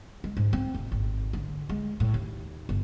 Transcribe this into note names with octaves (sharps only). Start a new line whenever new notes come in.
G#3
G#2
C4
F1
G#1
D3
G#3
A2
D#2
G1